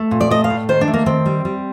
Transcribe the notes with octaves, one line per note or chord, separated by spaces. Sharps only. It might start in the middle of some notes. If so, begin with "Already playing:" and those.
Already playing: A3
A#2
D5
A3 D#5
F5
A2
D#3 C5
D4
A3
A#3
D#3 C4
G3
G3